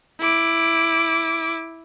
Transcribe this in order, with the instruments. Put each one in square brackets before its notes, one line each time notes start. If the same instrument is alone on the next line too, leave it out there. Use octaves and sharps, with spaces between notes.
[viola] E4 D6